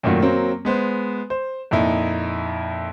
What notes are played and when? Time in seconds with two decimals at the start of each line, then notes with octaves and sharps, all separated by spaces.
0.03 F#2 A#2 D#3 A3 F4 F#4
0.22 F#3 A#3 C4
0.65 G#3 B3 C5
1.30 C5
1.71 F2 A#2 D#4 E4